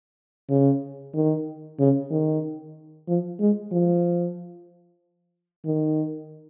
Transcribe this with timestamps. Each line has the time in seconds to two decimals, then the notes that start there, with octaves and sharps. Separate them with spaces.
0.50 C#3
1.14 D#3
1.79 C#3
2.11 D#3
3.08 F3
3.40 G#3
3.72 F3
5.65 D#3